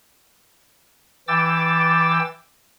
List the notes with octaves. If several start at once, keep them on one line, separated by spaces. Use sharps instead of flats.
E3 G5 D6 E6 A6